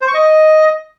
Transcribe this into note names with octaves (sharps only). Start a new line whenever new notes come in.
C5
C#6
D#5